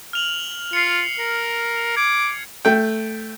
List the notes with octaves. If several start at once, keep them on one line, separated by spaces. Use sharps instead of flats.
F6 F7 F#7
F4 C7 C#7
A#4
D6 G#6
A3 G5